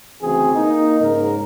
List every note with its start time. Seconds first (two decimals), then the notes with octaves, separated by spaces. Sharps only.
0.22 D2 C#3 E3 C4 F#4 G#4
0.56 A#3 D#4
1.00 G#2 C#3 A#4